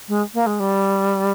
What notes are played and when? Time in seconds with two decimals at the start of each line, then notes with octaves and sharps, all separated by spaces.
0.08 G#3
0.34 A#3
0.46 G#3
0.59 G3